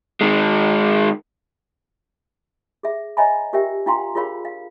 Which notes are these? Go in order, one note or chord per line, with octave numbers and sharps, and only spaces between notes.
D#3 G#3
G#4 E5
C#5 D#5 E5 G#5 A#5 B5
F4 G4 A#4 C#5 E5 G5
D4 F4 F5 G5 A#5 C6
F4 G#4 A#4 C#5 F5 B5
F5